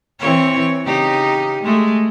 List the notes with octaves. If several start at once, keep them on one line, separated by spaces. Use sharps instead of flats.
E3 C4 C#5
C#3 D#4 G4
G#3 A3